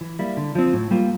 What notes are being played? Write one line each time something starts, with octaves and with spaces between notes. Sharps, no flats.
E3
G3 A#3 E4
D3
F3 C4
A2
G3 A#3 F4